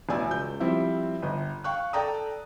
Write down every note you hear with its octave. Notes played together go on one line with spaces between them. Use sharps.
A1 B2 D5 G#5 E6
C#2 G6
F3 G3 C4 E4
G1 D#5
F5 G5 C#6 F#6
A4 D5 G5 A#5 D#6